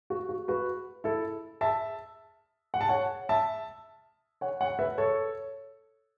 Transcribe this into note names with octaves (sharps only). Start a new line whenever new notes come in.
F#4
F#4
F#4 B4
E4 A4
E5 A5
F#5
A5
C#5 F#5
E5 A5
C#5 F#5
C#5 F#5
B4 E5
A4 C#5